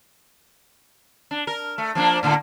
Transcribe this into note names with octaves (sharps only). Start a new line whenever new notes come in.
D4
A#4
A3
F3 A#3 D4
A2 D3 A#3